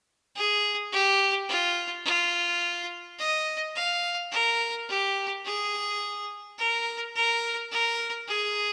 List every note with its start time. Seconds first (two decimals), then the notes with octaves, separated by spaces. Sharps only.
0.36 G#4
0.93 G4
1.49 F4
2.05 F4
3.19 D#5
3.75 F5
4.32 A#4
4.89 G4
5.45 G#4
6.59 A#4
7.15 A#4
7.72 A#4
8.28 G#4